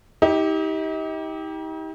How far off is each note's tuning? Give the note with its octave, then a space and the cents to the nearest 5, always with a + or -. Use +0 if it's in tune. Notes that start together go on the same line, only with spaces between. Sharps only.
D#4 +40 G4 +0